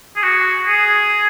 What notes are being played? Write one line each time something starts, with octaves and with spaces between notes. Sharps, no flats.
G#4
F#4
G#4